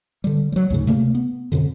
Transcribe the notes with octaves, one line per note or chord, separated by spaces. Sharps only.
D3 G3
F#3 G3
D2 G#2 C#3
C3 A3 A#3
B3
F2 G#2 B2 D3